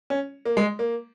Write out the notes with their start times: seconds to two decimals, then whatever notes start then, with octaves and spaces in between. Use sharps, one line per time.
0.10 C#4
0.45 A#3
0.57 G#3
0.79 A#3